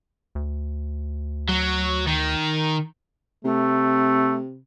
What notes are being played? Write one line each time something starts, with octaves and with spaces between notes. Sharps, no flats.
D2
F#3
D#3
C3 A3